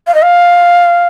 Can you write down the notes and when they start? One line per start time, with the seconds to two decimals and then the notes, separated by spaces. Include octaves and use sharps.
0.07 F5
0.15 D#5
0.22 F5